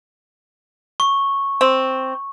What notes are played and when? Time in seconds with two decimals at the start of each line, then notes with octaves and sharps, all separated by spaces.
1.00 C#6
1.61 C4